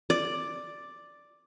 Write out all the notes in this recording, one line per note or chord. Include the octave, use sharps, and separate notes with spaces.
D5